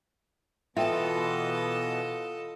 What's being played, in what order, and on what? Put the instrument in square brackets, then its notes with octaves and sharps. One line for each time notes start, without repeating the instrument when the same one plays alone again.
[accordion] B2 E3 B3 [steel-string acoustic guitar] F4 [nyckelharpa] A4 D#5 [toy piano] E5 G5